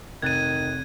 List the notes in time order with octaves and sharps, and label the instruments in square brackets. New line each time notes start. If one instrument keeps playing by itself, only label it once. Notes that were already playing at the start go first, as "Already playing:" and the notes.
[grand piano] F1 F#6 A6 [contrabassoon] D#3 [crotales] G#6 D#7